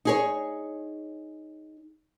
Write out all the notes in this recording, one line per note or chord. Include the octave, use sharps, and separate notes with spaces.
D#4 G#4 C#5